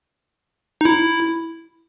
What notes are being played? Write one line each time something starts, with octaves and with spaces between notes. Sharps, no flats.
D#4
E4